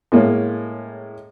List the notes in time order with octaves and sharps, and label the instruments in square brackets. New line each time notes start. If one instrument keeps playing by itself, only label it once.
[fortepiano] A2 G#3 A#3 C#4